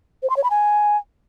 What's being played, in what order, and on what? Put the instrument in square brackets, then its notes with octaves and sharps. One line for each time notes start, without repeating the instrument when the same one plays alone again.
[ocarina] C5
C6
C#5
B5
G#5